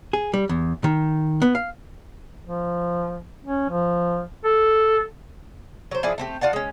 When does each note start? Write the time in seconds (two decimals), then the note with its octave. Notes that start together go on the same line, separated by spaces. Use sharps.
0.13 G#4
0.34 G3
0.49 E2
0.84 D#3
1.42 B3
1.55 F5
2.46 F3
3.43 C#4
3.70 F3
4.45 A4
5.91 F#3 C5
6.03 F3 E4 G#4 D5
6.18 A3 C4 G4
6.41 F4 D5 F#5 A5
6.53 G#3 C#4